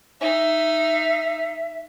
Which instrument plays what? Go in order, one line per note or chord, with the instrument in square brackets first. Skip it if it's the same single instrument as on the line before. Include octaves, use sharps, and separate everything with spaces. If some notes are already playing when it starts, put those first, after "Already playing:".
[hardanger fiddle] D#4 [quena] E5